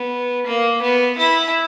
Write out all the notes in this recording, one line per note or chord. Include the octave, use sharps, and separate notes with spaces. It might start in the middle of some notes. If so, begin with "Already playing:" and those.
Already playing: B3
A#3
B3
E4